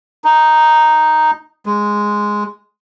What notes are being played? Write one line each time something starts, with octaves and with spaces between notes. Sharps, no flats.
D#4
G#3